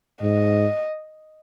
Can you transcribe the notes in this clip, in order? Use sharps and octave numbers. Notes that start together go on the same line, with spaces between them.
G#2 D#5